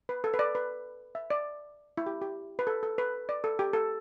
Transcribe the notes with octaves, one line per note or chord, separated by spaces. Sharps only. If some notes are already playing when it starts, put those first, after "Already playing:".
B4
A4
B4
D5
B4
E5
D5
E4
G4
G4
B4
A4
A4
B4
D5
A4
G4
A4